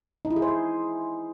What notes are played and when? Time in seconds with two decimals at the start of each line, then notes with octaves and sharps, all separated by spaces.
0.25 D#4
0.31 E4
0.36 G#4
0.42 C5
0.48 G#4